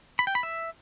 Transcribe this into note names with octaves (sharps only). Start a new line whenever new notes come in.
B5
G5
B5
E5